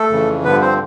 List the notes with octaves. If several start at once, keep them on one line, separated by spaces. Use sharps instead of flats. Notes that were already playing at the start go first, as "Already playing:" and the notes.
Already playing: A3 A4
F2 C#3 E3
G2 D3 F3 B3 B4
C4 C5